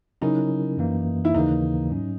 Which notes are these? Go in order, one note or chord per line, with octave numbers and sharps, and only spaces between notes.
C#3 F#3 C#4 D#4 E4 A#4
F#2 E3 A#3
E4
D#2 C#3 E3 A#3 D#4
G#2 F#3 C#4